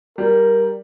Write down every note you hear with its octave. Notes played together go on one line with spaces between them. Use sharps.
G3 A#4